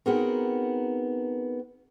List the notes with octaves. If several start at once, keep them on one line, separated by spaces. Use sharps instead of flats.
B3 C4 D#4 F#4 G#4 A#4